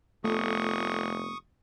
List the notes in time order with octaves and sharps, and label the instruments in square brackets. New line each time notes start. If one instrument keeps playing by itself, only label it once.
[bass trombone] F1 [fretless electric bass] A3 B3 [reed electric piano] F4 A4 [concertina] C#6 D#6